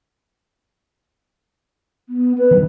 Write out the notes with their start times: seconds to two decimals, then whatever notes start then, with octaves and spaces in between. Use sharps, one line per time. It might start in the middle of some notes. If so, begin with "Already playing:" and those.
2.09 B3
2.38 B4
2.51 D3 D#3 G3